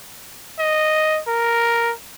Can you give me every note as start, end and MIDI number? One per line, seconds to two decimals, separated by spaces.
0.59 1.20 75
1.28 1.93 70